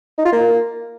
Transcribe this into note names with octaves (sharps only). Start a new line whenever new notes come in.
D#4
F4
A#3